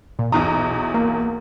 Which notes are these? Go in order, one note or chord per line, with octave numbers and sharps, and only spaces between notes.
A#2
B1 E2 A#5 D#6
A#3